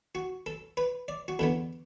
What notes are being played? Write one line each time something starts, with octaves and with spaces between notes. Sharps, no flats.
F#4
A4
B4
D5
F#4
E2 D3 B3 A4